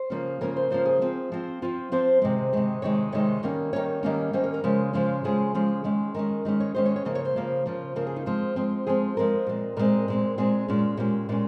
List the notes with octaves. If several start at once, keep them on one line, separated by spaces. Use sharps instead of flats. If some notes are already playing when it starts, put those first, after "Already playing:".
Already playing: C5
C#3 F3 A#3 C#4
C#3 F3 A#3 C#4 A#4
C5
C#3 F3 A#3 C#4 C5
G#4
F3 C4
F3 C4
F3 C4 F4
F3 C4 C5
C3 D#3 G#3
C3 D#3 G#3
C3 D#3 G#3 C#5
C3 D#3 G#3 C#5
D#3 G3 A#3 C#4
D#3 G3 A#3 C#4 C#5
D#3 G3 A#3 C#4
D#3 G3 A#3 C#4 C5
A#4
A#4
C#3 F3 G#3 C#4
C#3 F3 G#3 C#4
C#3 F3 G#3 C#4 G#4
C#3 F3 G#3 C#4
D#3 G#3 C#4
D#3 G#3 C#4 A#4
D#3 G#3 C#4
C#5
D#3 G#3 C#4 C5
C#5
C#5
C#3 F3 A#3 D#5
C#5
C5
C#3 F3 A#3
C#3 F3 A#3
C#3 F3 A#3 A#4
G#4
D#4
F3 G#3 C4
F3 G#3 C4
F3 G#3 C4 G#4
F3 G#3 C4 A#4
A#2 G#3 C4
A#2 G#3 C4 A#4
A#2 G#3 C4
A#2 G#3 C4 G#4
A#2 G#3 C#4
A#2 G#3 C#4 G4
A#2 G#3 C#4